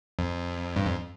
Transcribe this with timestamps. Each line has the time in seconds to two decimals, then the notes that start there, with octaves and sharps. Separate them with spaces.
0.19 F2
0.76 G2
0.86 F2